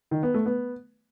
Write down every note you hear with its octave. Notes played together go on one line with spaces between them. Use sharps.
D#3
B3
A3
B3